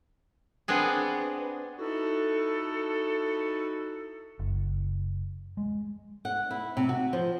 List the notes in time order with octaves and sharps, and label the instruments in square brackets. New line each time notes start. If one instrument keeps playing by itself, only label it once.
[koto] B3 C4 D4 G#4
[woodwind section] D#4 E4 F#4 A4
[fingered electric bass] F#1
G#3
[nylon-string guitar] F#5
E4
C3
F#4
F3